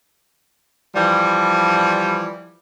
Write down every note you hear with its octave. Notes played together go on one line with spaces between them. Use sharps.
E3 F3 G3